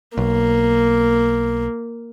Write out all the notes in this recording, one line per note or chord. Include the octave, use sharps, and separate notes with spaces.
B1 A#3